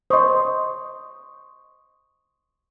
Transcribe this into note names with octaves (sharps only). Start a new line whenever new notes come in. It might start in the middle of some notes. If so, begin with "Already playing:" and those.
C5 D#5 C6 C#6 D#6